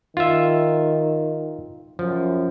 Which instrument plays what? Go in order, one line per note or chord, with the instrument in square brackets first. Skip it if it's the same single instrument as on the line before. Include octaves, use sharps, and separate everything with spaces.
[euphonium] D#3 [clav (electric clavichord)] F4 E5
[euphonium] F#2 [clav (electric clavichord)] F3